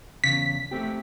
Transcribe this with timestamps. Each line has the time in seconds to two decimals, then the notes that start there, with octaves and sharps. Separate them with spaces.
0.24 E2 C#3 B6
0.71 A3 C4 G4